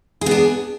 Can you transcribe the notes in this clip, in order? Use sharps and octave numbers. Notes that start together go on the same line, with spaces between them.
B3 D4 G#4